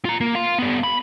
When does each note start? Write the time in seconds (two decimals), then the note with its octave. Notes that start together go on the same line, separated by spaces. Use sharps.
0.05 F4 A#5
0.21 A#3
0.35 F5 C6
0.58 G3 B3
0.83 B5